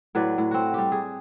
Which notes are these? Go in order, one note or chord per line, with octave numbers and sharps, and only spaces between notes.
A2 F#3 B4 D5
A2
C4 F#4
G3 G4
G#4